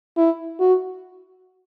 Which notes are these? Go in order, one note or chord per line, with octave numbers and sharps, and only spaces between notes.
E4
F#4